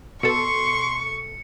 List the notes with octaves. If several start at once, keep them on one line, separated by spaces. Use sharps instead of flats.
B2 A4 C6 C#6 C#7